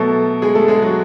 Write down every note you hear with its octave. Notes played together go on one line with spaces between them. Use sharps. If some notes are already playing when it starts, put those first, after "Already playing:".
Already playing: B2 F#3 A3 A4
G#3 G#4
A3 A4
G#3 G#4
F#3 F#4